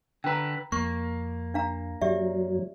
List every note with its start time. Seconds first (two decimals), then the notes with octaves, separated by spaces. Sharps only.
0.24 D3 B4 G5 A#5
0.72 F2 A#3 C#6
1.54 D4 F5 A#5
2.01 F#2 F#3 G4 D5 E5